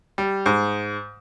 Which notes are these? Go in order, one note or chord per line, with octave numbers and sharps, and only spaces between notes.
G3
G#2